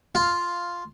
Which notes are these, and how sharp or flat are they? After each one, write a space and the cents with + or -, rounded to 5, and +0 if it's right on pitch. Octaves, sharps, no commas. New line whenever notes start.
F4 +0 F5 +0